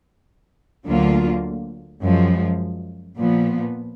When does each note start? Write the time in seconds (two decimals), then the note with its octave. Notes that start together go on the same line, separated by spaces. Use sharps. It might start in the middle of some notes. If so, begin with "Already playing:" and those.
0.87 D2 D3 F#3 A#3 F4
2.02 F#2 F3 G#3
3.18 A#2 F3 B3